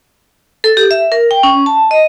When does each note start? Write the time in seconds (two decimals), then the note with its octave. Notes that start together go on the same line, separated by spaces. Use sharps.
0.64 A4
0.77 G4
0.91 E5
1.12 A#4
1.31 G5
1.43 C#4
1.66 A5
1.91 D#5